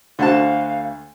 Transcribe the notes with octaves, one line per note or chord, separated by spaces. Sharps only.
D2 D3 F#4 C5 F5 A5